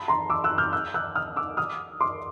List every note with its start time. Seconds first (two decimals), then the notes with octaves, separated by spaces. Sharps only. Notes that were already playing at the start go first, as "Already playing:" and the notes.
Already playing: A5 B5
0.08 A#5 C6
0.30 D6 E6
0.44 E6 F#6
0.58 F6 G6
0.73 E6 F#6
0.94 E6 F#6
1.15 D#6 F6
1.36 D6 E6
1.57 D#6 F6
2.01 C6 D6